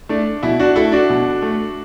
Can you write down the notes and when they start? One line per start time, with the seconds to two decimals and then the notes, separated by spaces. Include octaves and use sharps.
0.09 A3 D4
0.43 B2 E4
0.59 D4 F#4
0.76 A3 E4 A4
0.92 D4 F#4
1.10 B2
1.42 A3